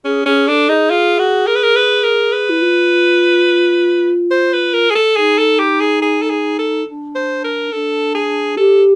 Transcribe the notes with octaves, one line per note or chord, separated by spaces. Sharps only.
C#4 G#4
C#4 G#4
D4 A4
D#4 G#4
F4
F#4
A#4
B4
A#4
B4
A#4
B4
E4
F4
C5
B4
A#4
G#4
A4
D#4 G#4
A4
G4
G#4
G#4
A4
G#4
A4
D4
C5
A#4
D4 A4
G#4
G4 A4